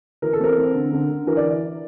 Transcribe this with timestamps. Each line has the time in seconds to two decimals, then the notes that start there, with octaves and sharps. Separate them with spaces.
0.22 E3 A#4
0.33 A4
0.40 C4 A#4
0.58 C4
0.75 D3
0.93 D3
1.10 D3
1.27 E3 A#4
1.37 D5